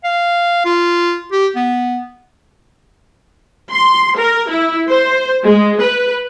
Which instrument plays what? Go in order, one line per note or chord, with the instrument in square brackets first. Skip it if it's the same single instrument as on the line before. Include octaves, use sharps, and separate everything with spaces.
[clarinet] F5
F4
G4
B3
[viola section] C6
A#4
E4
C5
G#3
B4